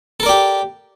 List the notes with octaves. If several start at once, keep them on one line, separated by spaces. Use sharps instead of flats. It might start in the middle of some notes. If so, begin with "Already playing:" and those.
G4 A4 A#4 D5